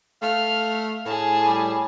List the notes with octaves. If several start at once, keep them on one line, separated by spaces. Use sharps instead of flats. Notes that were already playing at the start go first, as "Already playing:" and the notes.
A3 F5 F6
A2 G#4 A5
G3